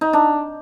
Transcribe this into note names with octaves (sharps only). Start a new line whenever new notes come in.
D#4
D4